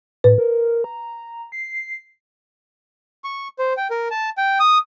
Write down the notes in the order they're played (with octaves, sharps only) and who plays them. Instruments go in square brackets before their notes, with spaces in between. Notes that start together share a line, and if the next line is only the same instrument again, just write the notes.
[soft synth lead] A2 [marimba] B4
[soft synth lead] A#4
A#5
C7
[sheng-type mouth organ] C#6
C5
G5
A#4
A5
G5
D#6